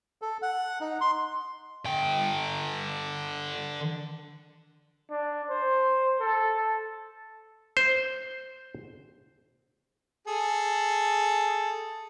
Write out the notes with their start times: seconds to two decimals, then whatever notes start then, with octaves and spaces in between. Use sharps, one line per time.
0.22 A4
0.42 F#5
0.81 D#4
1.01 C6
1.86 D3 G5
5.11 D4
5.50 C5
6.20 A4
7.77 C5
10.27 G#4 A4